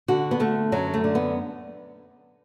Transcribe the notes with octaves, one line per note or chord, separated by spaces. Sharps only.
D3 F#4
B3
D3 A3
F#2 F#3
A3
D3
B3